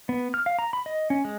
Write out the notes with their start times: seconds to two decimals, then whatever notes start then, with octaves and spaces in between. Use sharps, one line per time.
0.09 B3
0.34 F6
0.46 F5
0.59 A#5
0.73 B5
0.86 D#5
1.10 C#4
1.25 G#3